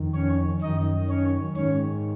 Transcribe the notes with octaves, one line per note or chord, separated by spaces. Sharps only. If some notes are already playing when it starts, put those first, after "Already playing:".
Already playing: F2 D#3
C#4 C#5
F#2 D#3 D#4 D#5
C#4 C#5
G#2 D#3 C#4 C#5